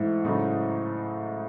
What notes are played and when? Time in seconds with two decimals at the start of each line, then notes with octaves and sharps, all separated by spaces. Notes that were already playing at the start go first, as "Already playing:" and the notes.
Already playing: G#2 E3 A3 E4
0.25 A2 C#3 F#3 A3 D#4